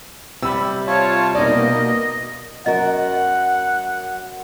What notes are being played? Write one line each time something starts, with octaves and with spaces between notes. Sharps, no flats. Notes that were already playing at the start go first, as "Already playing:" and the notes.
C3 G3 B5 E6
F4 C#5 A5
B2 A#3 D#4 D5 D#5
F#2 F#4 A#4 D#5 F#5